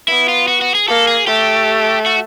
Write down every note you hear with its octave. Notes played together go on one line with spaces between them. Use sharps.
B3 E4
F4
F#4
F#4
G#4
A#3 A4
G#4
A3 G4
F#4